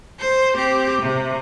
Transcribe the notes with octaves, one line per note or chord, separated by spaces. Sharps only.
C5
C4 G4
C3